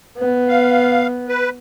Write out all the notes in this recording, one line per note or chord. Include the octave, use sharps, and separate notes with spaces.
B3
F5
B4